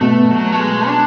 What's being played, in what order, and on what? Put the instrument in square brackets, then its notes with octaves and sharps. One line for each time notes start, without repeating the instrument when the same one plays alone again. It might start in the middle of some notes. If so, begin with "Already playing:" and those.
[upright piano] B2 [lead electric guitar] A3
[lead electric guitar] F#3
A3
G#3
D4